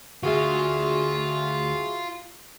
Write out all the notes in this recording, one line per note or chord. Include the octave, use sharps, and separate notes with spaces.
D2 F4 F#4 G#4 E5